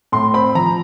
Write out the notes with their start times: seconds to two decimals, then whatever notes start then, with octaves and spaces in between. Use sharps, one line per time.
0.12 A2 C6
0.34 C4 B5
0.55 F3 A#5